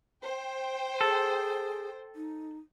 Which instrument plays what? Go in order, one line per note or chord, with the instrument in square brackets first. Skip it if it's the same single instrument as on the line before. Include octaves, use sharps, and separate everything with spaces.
[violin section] C5 G5
[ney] G#4 [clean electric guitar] A4
[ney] D#4